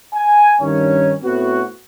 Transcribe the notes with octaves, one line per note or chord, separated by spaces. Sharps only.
G#5
G2 D#3 C#4 C#5
A2 A3 B3 C4 F#4